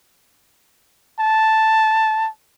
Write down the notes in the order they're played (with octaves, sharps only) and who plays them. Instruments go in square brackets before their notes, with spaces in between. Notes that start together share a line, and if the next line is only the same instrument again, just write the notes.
[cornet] A5